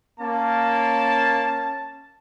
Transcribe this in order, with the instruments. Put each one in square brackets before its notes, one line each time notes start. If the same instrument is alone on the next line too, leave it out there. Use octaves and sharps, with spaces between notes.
[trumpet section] A#3 [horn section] C#4 A5